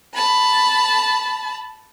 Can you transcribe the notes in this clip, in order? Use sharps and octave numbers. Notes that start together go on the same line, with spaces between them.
A5 B5